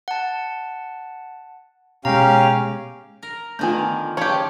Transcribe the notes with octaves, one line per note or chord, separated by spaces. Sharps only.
F#5 A5
B2 G#3 C#4 G4 F5 A#5
A#4
D3 D#3 F3 A3 B3 F4 G#5 G6
C#3 F3 G4 C#5